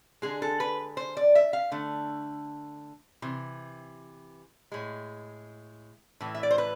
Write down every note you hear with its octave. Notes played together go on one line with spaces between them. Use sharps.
D3 G#3 G#4
A4
B4
C5
D5
E5
F5
D3 A3
C3 E3
A2 G#3
A2 E3
E5
D5
C5
B4